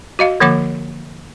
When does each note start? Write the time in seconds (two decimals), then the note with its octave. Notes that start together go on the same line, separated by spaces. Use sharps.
0.19 F#4 D#5 F5
0.40 D3 F3 A#3 C#5 F#5 D6